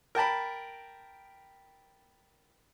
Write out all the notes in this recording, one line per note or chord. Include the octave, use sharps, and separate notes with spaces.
A#4 G5 A5 B5